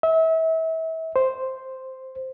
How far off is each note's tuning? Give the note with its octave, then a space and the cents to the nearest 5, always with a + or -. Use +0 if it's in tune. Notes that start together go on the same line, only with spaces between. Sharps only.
E5 -35
C5 +0